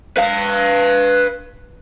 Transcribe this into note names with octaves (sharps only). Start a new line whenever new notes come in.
B4 F5